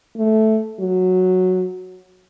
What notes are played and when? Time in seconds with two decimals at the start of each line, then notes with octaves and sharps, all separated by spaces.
0.17 A3
0.79 F#3